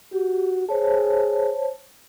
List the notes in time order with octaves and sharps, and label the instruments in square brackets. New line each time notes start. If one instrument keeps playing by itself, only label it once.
[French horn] F#4 [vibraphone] G4
[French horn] G#4 [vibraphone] C5 C#5 A5